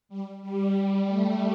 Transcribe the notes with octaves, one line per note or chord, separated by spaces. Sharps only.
G3
G3
G3
A3